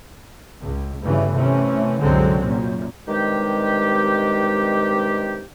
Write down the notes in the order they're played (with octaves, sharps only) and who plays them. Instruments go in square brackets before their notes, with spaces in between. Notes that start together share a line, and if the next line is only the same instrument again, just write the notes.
[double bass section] C#2
G1 G2 C#3 E3 A3
C3 E3 A3 C#4
C2 F#2 D3 F#3 G#3 C4
F#2 A#2
[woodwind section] G2 C3 D#3 G#3 G4